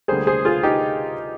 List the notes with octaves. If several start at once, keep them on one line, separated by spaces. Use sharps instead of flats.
D2 D3 G3 A#3 G#4 C5
G#4 C5
F4 G#4
D#4 G4